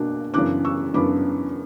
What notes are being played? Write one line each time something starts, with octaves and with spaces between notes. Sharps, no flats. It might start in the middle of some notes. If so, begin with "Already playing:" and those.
Already playing: B2 A#3 D4 D6 F#6
F#2 C#3 E3 B3 D4 D6 F#6
C#6 E6
F#2 C#3 E3 B3 D4 B5 D6